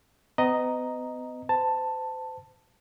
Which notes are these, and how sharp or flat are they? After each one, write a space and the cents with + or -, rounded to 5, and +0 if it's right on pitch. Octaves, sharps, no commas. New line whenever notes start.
B3 +40 D#5 +0 A#5 +0
C5 -35 A5 +10